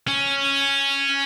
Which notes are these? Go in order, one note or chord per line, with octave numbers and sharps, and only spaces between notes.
C#4